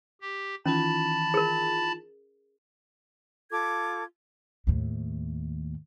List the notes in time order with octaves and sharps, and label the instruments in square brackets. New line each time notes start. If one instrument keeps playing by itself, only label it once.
[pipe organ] G4
[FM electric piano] D#3 E3 F4 [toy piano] C#4 [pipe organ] A5 B5 A6
[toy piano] G#4 A#4
[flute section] F4 A4 D6 G#6
[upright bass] D#2 A2